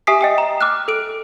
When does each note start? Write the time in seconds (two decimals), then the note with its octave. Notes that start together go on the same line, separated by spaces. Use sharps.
0.07 G4 E5 G#5 D#6 B6 C7
0.21 D#5 G5 D#6
0.38 A#5
0.61 D6 F6 F#6
0.88 A4 D7